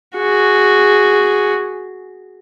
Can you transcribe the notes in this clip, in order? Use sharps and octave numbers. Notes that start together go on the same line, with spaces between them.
F#4 G#4